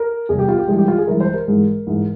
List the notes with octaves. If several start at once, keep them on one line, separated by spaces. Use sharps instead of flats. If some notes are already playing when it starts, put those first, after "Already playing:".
Already playing: A#4
E2 C3 G3 G#4
G4
F4
G4
G2 E3 G#3 G#4
G4
F4
G#4
G2 E3 G#3 A#4
C5
A#4
G#2 E3 G#3
G#2 E3 G#3